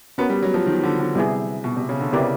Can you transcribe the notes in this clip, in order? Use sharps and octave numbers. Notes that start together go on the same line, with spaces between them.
B3 C#4 F#4 A#4
G3
F#3
F3
D#3
D3
D3
C3 G3 B3 E4 G#4
B2
C3
C#3
D3
C3 B3 E4 G4 A#4 D5
C#3